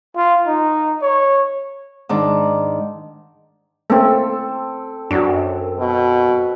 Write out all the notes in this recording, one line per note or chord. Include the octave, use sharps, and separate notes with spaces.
F4
D#4
C#5
G#2 D#3 D4
A3 A#3 C4 C#4 A4
F#2 D4 F#4
B2